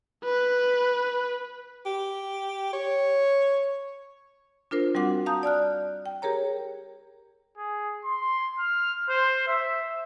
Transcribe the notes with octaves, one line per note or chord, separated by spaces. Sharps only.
B4
G4
C#5
D4 F4 A#4 C5
G3 C4 F#4 F#5 D6
F5 A5 A#5 D#6 G6
D5 A5 F6 F#6
G5
G4 G#4 A#4 C#5 A#5
G#4
C6
F6
C5
E5